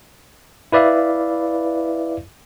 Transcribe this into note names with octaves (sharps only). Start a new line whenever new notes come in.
E4 B4 D5 E5 F5